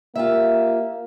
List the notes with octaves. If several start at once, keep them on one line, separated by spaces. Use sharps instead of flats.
A#3 F4 G4 E5